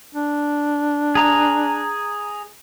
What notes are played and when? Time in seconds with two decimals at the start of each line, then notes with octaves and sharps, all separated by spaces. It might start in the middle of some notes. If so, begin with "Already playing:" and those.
0.15 D4
1.15 G#4 A#5